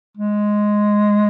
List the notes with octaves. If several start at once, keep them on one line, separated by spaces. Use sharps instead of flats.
G#3